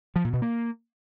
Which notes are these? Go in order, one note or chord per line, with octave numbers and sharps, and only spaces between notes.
F3
A#2
B2
A#3